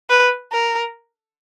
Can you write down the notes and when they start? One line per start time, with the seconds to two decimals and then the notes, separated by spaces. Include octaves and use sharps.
0.10 B4
0.52 A#4